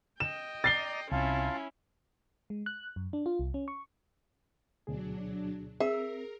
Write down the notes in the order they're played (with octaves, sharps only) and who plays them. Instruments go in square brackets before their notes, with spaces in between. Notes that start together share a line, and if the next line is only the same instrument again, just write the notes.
[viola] D#5 G5 [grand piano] E7
[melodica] D5 A#5 [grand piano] A6 C7 G7
[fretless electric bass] C2 [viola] C#4 E4 [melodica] F4 F5 A5
[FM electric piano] G#3
F#6
F#2
D4
F4
C2
C#4
C#6
[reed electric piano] D2 B2 G#4 [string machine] F#3 D4
[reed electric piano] C4 [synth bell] G#4 [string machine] A#4 [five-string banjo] E5